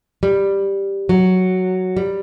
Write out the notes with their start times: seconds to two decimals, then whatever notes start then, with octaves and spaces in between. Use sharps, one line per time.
0.23 G3
1.09 F#3
1.97 G3